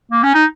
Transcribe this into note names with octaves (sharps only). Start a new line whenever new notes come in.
A#3
C#4
D#4